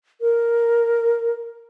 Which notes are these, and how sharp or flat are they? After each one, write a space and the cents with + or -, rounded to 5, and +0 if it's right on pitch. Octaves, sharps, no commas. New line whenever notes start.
A#4 +0